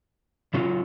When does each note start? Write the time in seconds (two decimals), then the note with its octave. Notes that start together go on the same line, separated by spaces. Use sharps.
0.54 C#3 F#3 C#4 F4